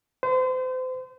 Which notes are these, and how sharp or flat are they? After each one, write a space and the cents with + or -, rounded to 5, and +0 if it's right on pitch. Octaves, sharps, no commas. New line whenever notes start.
C5 -35